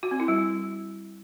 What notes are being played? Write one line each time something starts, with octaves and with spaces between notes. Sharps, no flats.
F#4
C4
E4
G3